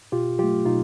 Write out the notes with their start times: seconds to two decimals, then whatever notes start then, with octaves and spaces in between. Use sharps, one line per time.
0.12 B2 F4 G4
0.39 F#3 A3 F4 G4
0.66 B2 D#4 F4